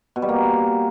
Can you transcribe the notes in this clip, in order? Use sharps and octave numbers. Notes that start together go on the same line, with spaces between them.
B2
G3
A#3